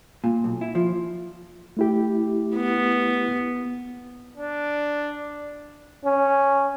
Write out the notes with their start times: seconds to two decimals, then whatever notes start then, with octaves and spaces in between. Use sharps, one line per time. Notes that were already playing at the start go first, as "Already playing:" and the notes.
0.24 A#2
0.44 B1
0.61 E4
0.75 F3
1.77 A3 E4 G4
2.55 B3
4.37 D4
6.05 C#4